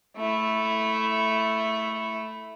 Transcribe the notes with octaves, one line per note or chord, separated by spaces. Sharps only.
A3 E4